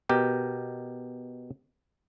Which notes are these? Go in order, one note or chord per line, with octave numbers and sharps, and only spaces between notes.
B2 G4 A#4